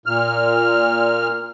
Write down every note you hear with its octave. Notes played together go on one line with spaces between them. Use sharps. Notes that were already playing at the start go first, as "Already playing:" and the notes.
A#2 F6